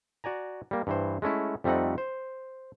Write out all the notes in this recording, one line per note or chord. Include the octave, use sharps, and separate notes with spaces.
F#4 D5 G#5 A#5
G3 A#3
G2 E3 C5
G#3 A3 C#4 E4
F2 G3 A3 C4 D#4 F#5
C5